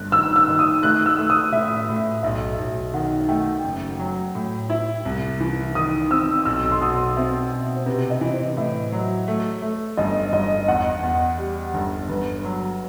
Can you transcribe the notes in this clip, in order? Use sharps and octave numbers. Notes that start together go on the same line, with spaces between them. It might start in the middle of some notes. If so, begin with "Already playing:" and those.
Already playing: G1 F#6
D#3 E6
E6
D#3
D#6
A3 F#6
E6
A3
D#6
A2 E5
A2
B1 E5
B1
D#3 F#5
A3 G5
F#1
F#3
A2
E4
C2
E3
D#3 D#6
C4 E6
B1 E6
C6
B2 D#6
C4 E5
B2
C5
C3 B4
D#5
E3
C5
A2 E5
F#3
A3
A3
G1 D#5
G1 D#5
E2 F#5
E2
G3
G1
G1 B4
F#3